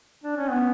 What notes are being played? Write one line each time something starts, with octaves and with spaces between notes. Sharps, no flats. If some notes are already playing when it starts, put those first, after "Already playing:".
D4
C#4
B3